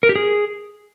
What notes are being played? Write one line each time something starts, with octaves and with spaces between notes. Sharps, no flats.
A#4
G4
G#4